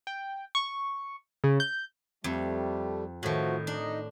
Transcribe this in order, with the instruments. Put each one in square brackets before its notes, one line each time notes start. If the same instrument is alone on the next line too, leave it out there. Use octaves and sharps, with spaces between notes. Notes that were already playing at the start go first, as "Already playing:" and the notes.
[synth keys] G5
C#6
C#3
G6
[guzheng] F2 [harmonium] G3 A3
[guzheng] A2 D#3 [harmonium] F3 A3 F#4
[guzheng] D4 [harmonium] D#4 D#5